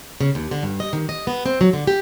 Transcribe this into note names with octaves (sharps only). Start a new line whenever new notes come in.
C#3
D#2
D3
G2
D#5
D#3
D#5
B3
C4
F#3
D3
G4